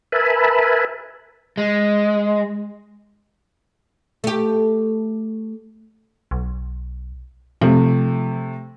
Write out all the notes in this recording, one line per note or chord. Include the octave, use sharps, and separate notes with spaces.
A#4 B4 E5 G#5 A5 B5
G#3
A3 G4
B1
C3 F3 A3 C4